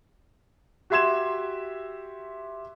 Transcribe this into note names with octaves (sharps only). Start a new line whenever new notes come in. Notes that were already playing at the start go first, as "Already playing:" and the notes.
F#4 G4 E5 C6 G#6 E7